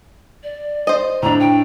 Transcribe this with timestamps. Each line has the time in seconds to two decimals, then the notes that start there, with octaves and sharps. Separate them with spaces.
0.43 D5
0.87 C5 D#5
1.23 A2 D4 A#5
1.40 G5